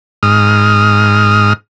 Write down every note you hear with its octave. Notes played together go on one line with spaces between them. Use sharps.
G#2 D#6 F6